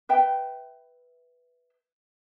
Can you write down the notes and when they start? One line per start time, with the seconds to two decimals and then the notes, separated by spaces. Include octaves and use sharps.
0.09 B4 E5 G5